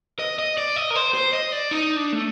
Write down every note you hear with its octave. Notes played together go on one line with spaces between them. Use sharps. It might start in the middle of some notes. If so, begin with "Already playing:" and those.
D#5
D#5
D5
D#5
A#4
C5
C5
D#5
D5
D#4
D4
A3